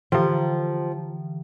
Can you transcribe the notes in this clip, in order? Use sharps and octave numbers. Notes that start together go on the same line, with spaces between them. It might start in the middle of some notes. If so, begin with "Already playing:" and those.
D3 E3 F3